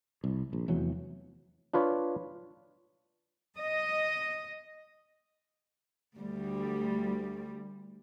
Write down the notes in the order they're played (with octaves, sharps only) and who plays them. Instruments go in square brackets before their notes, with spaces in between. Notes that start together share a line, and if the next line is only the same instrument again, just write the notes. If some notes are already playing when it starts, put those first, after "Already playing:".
[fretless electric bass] C2
A#1
F1 E2 E3 F#3
[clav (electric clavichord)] D4 F4 B4 C#5
[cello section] D#5
D2 G3